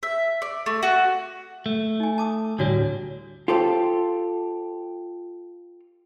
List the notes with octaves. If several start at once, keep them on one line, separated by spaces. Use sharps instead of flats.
E5
D5
A3
F#4
A3
D#4 G#5
A5 D6 D#6
D2 A2 G3 D4 F#4 C#5
F4 G4 A4 C5